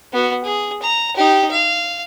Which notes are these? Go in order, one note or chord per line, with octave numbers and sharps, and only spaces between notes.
B3 F#4
G#4
A#5
D#4 G4
F5